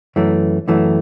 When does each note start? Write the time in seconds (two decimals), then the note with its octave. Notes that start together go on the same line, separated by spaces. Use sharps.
0.16 F#2 E3 A3
0.68 F#2 E3 A3